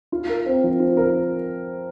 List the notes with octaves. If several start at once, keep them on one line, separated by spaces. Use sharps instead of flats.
F4
A#4
C4
F3
F4
A#4